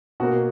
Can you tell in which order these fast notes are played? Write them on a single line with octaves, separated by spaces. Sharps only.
B2 F#4 A#3